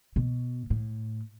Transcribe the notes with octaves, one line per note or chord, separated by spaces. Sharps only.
B2
A2